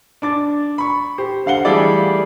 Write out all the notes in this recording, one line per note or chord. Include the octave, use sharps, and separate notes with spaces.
D4 D6 A6
B5 C#6
G4 C5
D3 F5 F#5 G7
E3 G3 A3 G#4 A4 D5